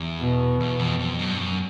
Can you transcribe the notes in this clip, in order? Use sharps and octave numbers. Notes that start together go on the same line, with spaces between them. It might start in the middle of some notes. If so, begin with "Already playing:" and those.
Already playing: E2
B2
E2
F2
F2
F#2
G2
F#2